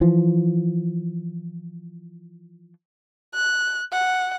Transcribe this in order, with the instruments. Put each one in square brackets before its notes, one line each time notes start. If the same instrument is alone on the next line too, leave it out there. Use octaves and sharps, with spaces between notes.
[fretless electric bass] E3 F3
[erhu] F#6
F#5